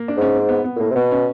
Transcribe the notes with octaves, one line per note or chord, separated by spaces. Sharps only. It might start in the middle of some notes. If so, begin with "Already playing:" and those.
Already playing: A#3
D4
G#2 C#4
C4
B3
B3
A#2
A2 A#3
C3
B2 B3
C#4